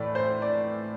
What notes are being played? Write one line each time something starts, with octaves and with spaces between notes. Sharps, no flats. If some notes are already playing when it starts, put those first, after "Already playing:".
Already playing: A2 E3 A3 D5
C5
D5